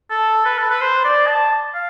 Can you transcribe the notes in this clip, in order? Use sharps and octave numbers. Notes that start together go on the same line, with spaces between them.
A4
B4
A4
B4
C5
D5
A5
F5